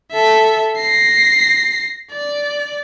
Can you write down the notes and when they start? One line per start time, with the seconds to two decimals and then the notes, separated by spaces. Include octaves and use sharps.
0.12 A4 E5
0.77 A#6 C7
2.12 D5